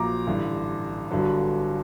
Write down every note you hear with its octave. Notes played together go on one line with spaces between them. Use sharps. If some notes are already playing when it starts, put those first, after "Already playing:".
Already playing: A#1 A#2 F#3 A#5 D6
A1 G2 D3
G1 G2 D3 F#3